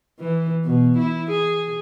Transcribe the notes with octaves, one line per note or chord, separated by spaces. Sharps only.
E3
B2
E4
G#4